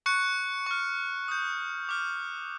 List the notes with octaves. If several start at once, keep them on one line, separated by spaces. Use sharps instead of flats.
C#6 F#6 C#7
C#6 F6
D#6 G6
D6 F6